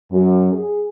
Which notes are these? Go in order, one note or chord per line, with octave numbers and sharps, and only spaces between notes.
F#2
G#4